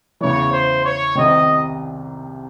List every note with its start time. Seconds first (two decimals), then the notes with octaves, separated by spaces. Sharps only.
0.21 E2 C#3 E3 C#5
0.53 C5
0.84 C#5
1.15 C2 C3 D#3 D#5